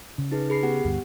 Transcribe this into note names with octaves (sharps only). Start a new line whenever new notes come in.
C#3
D#4 G#4 B4
G#4 B5 C7
B3 G4 F#5
D2 G2